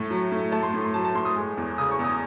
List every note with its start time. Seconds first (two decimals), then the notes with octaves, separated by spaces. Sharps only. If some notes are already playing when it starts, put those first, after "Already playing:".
Already playing: A2 A3
0.11 F#3
0.32 A2
0.52 A3 A5
0.62 C6
0.74 A2
0.84 C6
0.94 F#3 A5
1.05 A5
1.15 A2 C6
1.25 D#6
1.36 G#3
1.57 E2
1.78 C#3 D#6
1.91 C#6
1.99 E2 D#6